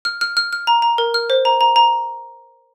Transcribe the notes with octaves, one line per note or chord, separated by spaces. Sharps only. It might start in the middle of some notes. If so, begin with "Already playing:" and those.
F6
F6
F6
F6
A#5
A#5
A#4
F6
C5
A#5
A#5
A#5